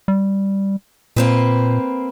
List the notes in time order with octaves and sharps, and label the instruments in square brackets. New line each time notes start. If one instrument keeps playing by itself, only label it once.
[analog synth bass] G3
[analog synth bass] A#2 [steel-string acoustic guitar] A#3 C4 B4